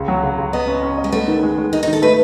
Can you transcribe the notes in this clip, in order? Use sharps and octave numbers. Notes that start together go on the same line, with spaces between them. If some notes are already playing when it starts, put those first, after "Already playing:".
Already playing: C#2
F#3
C#2
C#2
B3 D#5
C#4
C#4
D#5
G#3
A3 B3
D#3
G#3
G#3
D#3 D#4
D#4
D#3
A4
A3 B4